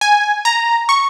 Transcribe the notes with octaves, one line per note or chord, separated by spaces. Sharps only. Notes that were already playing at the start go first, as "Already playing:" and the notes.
G#5
A#5
C#6